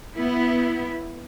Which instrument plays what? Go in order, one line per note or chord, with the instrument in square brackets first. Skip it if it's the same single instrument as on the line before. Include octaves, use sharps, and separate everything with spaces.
[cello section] B3 E4